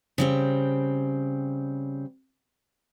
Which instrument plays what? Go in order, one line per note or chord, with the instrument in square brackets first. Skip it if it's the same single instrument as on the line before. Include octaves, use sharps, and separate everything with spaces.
[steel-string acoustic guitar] C#3 G3 C4